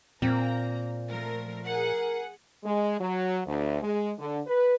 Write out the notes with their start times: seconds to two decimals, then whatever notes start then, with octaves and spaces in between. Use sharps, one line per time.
0.22 A#2 A#3 C4 A#5
1.08 F3 A3 A#4
1.64 G#4 A#4 F#5
2.65 G#3
3.00 F#3
3.47 D2
3.83 G#3
4.18 D3
4.47 B4